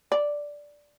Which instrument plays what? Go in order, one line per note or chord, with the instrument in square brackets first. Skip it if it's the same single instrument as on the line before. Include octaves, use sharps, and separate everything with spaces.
[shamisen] D5